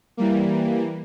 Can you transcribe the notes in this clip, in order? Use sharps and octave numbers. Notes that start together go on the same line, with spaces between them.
E3 G3 A#3